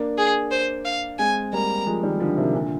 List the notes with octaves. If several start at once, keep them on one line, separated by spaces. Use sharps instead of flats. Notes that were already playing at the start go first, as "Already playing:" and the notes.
Already playing: A#3 D4
G#4
C5
F5
G#3 C4 G#5
G3 A#3 A#5
F3 G#3
D#3 G3
D3 F3
C3 D#3
A#2 D3